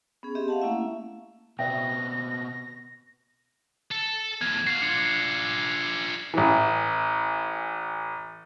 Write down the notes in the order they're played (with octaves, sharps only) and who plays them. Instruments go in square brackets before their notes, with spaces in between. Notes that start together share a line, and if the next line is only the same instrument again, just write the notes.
[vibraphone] B3 C#4 G#4
C4 G4 D#5 E5
F5 F#5 A5
A3 A#3 C#4 E4 E5
[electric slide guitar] B2 B3 C4 [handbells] D5 E5 G5 [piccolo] A#6
[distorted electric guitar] A4
[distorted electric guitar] E2 A2 [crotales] G#6
[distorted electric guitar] F#4 F5 [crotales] G#6 C7
[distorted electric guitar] D4 F4 [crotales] C#7
[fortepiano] A1 E3